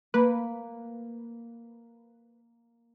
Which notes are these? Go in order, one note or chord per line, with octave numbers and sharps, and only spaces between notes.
A#3 B4